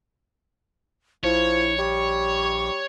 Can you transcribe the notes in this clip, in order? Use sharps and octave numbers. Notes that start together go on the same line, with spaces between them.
A#1 F3 E4 C#5
G3 C#6